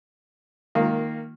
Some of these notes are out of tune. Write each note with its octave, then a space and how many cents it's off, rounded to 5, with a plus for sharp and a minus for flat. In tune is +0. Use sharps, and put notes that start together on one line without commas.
D#3 +0 A#3 -15 F4 +20